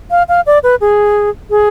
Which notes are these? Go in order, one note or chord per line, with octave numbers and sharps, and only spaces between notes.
F5
F5
D5
B4
G#4
G#4